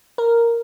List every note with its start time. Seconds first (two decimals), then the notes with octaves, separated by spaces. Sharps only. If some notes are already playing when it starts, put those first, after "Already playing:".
0.18 A#4